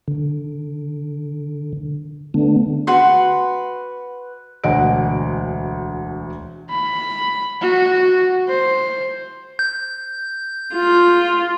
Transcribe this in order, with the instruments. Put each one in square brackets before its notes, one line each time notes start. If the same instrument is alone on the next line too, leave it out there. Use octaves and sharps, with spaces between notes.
[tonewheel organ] D3
D3 A3 B3 D4
[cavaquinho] F#4 B4 F#5 C6
[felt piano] E1 D2 D#5 F#5 D7
[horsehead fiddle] B5
F#4
C5
[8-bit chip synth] G6
[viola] F4